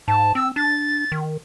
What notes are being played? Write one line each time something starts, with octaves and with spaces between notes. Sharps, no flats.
G#2 A5
C4 E6
D4 A6
D#3